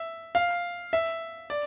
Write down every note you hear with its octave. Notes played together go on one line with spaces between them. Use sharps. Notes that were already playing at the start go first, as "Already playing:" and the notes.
Already playing: E5
F5
E5
D5